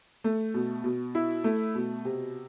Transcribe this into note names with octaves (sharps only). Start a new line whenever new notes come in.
A3
B2
B2
E4
A3
B2
C3